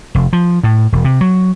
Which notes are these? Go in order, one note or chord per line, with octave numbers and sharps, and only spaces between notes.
F1
F3
A2
E1
C3
F#3